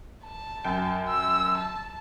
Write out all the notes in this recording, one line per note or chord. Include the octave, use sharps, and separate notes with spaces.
A5
F#2 G5
E6
A5